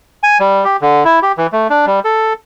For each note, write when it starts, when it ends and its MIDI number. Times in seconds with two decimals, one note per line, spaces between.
0.23 0.38 80
0.40 0.64 55
0.64 0.77 67
0.81 1.04 50
1.05 1.20 64
1.22 1.32 67
1.38 1.47 52
1.53 1.68 57
1.70 1.86 62
1.86 2.00 55
2.05 2.33 69